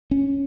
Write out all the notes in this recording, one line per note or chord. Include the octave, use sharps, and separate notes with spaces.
C#4